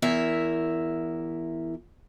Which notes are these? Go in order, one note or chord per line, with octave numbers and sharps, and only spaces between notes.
E2 E4 A#4 E5